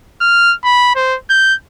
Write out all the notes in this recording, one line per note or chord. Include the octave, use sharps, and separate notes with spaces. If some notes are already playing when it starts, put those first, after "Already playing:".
F6
B5
C5
G6